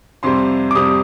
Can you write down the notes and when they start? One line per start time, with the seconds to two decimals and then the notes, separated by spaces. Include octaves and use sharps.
0.23 F2 C3 G3 C6
0.71 D6
0.75 F2 C3 G3 D#6